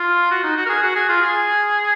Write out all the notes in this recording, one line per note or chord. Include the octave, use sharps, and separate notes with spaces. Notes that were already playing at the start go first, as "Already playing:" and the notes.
Already playing: F4
F#4
D#4
F#4
A#4
G#4
F#4
G#4
F4
G#4